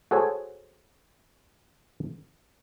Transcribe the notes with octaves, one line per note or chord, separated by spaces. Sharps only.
F#4 G#4 A4 C5 C#5 G#5